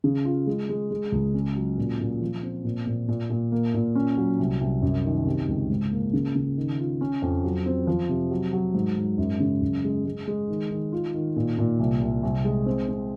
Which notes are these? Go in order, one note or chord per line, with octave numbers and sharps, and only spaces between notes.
C#3
F4
G#3
G#3
G#3
C#2
C#4
F#3
A#2
A#2
F3
C4
A#2
A#2
A#2
A#2
A#3
A#2
C#4
F#3
C2
C2
F#2
D#3
C3
C#2
G#2
A#3
C#3
C#3
D#3
F4
C#4
F2
F#3
C4
F3
C3
F#3
F#3
G#2
G#2
F#2
C#3
F#2
G#3
G#3
G#3
D#3
D#3
F4
D#3
A#2
A#2
C2
C2
C2
G#3
C4
C4